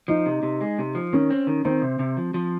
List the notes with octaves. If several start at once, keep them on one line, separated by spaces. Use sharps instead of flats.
F3 D#4
C3
C3
G#3
C3
F3
D#3 C#4
C4
D#3
D#3 C4
C3
C3
F3
F3